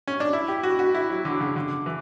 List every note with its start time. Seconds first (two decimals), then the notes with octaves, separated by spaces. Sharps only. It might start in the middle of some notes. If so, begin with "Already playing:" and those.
0.08 C#4
0.20 D4
0.33 E4
0.48 G4
0.63 F#4
0.79 F#4
0.94 E4
1.10 F#3
1.25 D3
1.40 C#3
1.56 D3
1.71 D3
1.86 E3